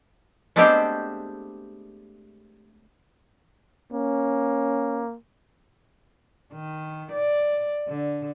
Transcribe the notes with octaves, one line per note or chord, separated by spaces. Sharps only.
G#3 A3 B3 C4 D4 G4
A#3 C#4
D#3
D5
D3